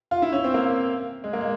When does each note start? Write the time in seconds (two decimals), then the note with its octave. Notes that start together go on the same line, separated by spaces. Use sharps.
0.11 F4
0.22 E4
0.32 C#4
0.44 C4
0.54 A#3
1.24 G#3
1.33 A#3
1.41 G#3